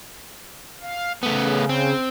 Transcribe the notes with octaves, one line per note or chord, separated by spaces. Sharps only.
F5
C#3 A3 B3
C4